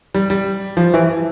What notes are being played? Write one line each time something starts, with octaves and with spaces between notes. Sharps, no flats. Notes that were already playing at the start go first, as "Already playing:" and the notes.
G3
G3
F3
E3